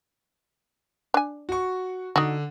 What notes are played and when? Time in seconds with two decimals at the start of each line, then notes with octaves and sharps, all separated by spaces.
1.14 D4 G#5
1.49 F#4 C#6
2.16 D3 D#4 F#4